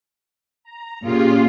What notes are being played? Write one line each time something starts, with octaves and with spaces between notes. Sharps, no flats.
A#5
A#2 C#4 F4 G4 G#4